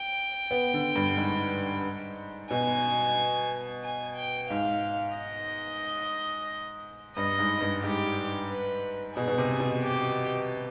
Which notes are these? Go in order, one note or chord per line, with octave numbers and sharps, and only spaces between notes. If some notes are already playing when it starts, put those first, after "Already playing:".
Already playing: G5
B3
D3
G2
G#2
B2 G#5
G#5
G5
G#2 F5
D#5
G2 D#5
G#2
G2
G#2 G4
B4
B2 G#4
B2
C3
B2
G4